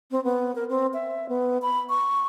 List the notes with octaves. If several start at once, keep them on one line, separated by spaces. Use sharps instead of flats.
C4
B3
A#4
C4
E5
B3
B5
C#6